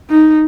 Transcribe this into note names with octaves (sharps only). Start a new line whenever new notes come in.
D#4